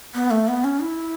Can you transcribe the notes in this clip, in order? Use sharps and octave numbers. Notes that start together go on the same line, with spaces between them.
B3
A3
B3
C#4
E4